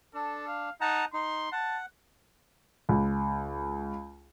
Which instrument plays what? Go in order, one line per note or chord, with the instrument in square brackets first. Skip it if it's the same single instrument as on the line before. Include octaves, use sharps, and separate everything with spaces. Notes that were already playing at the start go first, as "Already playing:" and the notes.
[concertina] D4 [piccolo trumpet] A4
[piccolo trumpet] F5
[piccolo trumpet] D#4 [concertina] F#5 A5 A#5
[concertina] D#4 [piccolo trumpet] C6
[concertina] F#5 [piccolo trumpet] A5
[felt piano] C#2